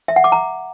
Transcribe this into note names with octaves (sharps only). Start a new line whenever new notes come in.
E5
F#5
D6
A#5